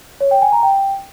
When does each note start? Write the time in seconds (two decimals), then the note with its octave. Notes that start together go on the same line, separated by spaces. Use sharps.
0.21 C#5
0.31 G5
0.42 G#5
0.52 A#5
0.63 G5